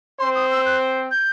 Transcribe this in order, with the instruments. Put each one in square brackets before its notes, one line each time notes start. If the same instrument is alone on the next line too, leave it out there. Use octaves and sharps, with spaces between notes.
[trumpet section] C4 C5 [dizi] C6
[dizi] D#6
E6
F#6
G6